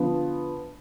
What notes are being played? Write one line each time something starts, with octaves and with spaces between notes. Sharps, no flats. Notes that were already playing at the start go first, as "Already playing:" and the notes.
Already playing: D3 F3 B3